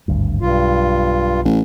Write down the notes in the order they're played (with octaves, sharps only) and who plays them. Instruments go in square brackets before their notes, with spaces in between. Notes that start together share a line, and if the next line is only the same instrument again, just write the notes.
[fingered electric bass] G#1 D2 G2
[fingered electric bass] B1 [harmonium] G2 F4
[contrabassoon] A1